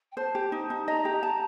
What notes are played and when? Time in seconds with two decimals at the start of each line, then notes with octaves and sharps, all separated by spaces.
0.12 G5
0.17 C5 A5
0.35 G4
0.52 D#4
0.70 D#4
0.87 D#5 A#5
1.05 G4
1.23 A5